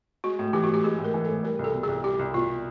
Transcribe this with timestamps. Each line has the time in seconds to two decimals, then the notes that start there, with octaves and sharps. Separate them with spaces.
0.24 G#3 F#4
0.39 A2
0.53 E3 G4
0.64 F#4
0.69 A2
0.74 G4
0.84 G#3 G#4
0.99 A2
1.04 A#4
1.14 E3
1.24 A2 A4
1.43 G3 A#4
1.59 C2
1.64 A4
1.74 B2
1.83 G#4
1.89 C2
2.04 G3 G4
2.19 C2
2.34 B2 F4